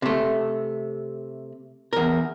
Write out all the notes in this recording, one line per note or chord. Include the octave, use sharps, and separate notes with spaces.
C3 A3
E2 A#4